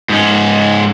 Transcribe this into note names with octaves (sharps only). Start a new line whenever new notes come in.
G#2 C#4